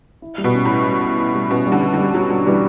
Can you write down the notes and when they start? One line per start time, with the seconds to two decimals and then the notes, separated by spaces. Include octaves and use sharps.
0.22 E4
0.38 G3
0.44 B2
0.54 C#4
0.65 A2
0.71 E4
0.86 G3
1.02 E4
1.18 E4
1.35 G3
1.50 B2 C#4
1.67 D3 G3
1.82 G3
1.94 D3 G3
2.14 F#3 G3
2.30 F#3 G3
2.47 E3 G3